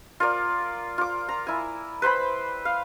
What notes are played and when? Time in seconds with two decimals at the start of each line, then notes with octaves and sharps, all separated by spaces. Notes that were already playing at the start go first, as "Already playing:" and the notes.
0.20 F4 A#4 D5
0.98 F4 D6
1.29 A#5
1.47 E4 G#5
2.02 B4 C5 G5 B5
2.65 F5